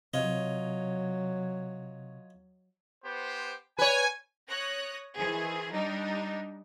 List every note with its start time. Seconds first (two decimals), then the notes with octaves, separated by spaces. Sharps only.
0.14 C3 F#3 F4 C#5 D#5
3.04 B3 G4 C5
3.79 B4 C#5 G#5
4.49 C#5 D#6 F#6 A#6
5.17 D#3 E3 G#4 C5
5.73 G3 D4 D#4